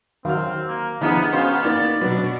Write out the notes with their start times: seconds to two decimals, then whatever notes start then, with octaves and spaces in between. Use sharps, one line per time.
0.25 D#3 F#3 C4 F5 F6
0.67 A#3
1.01 D3 F3 B3 D#4 E4 G#4 A#5 F6
1.33 B3 C#4 F#4 C5 F5
1.64 A#3 D#4 D5
2.01 B2 F#3 D4 B4